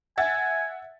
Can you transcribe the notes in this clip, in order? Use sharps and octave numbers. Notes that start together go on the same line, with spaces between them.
E5 F#5 G#5 A6